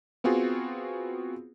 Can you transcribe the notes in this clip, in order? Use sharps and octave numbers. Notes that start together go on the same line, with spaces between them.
B3 C4 F4 F#4 G#4